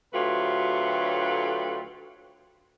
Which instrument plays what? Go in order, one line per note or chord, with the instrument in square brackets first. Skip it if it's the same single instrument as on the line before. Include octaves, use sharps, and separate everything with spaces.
[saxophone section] D2 F#3 A3 F4 G4 B4